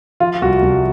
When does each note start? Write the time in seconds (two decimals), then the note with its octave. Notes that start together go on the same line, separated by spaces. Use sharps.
0.20 F3 F4
0.42 C2 F#4
0.62 C2